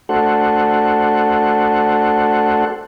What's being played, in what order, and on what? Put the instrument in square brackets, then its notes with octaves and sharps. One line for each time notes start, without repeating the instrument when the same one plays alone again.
[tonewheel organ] A3 D4 F#4 A4 C5 F#5